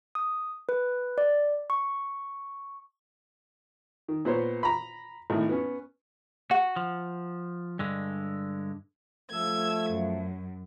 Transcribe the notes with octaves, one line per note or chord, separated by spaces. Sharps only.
D#6
B4
D5
C#6
D#3
A#2 B3 C5 C#5
A#5 B5
G#1 A2
B3 C#4
F#4 F#5
F3
G2 D3 G#3
F3 A3 E6 G#6
F#2